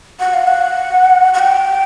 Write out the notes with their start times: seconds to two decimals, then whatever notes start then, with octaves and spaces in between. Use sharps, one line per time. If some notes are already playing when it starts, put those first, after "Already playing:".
0.20 F#5
0.34 F5
0.47 F#5
1.34 F#5
1.39 G5